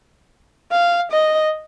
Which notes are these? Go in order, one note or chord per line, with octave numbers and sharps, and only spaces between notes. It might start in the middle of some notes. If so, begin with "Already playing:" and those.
F5
D#5